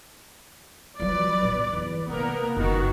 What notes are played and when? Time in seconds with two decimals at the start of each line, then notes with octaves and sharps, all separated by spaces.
1.00 F3 F#3 B4 D5
1.43 A#2 B3
1.73 E2
2.08 C3 A#3 B3 A#4
2.57 F#1 D#3 F#4